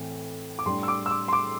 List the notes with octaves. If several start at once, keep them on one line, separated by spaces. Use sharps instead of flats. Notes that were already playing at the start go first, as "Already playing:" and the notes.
Already playing: A2 E3 C4
D6
A2 G3 D4 C6
E6
D6
E6
D6
C6
D6